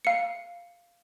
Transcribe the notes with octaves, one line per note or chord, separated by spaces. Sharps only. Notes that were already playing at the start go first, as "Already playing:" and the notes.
F5 C#7